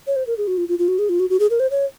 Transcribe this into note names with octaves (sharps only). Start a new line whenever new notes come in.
C#5
C5
A#4
G#4
F#4
F4
F4
F4
F#4
G#4
F4
F#4
F#4
G#4
A#4
C5
C#5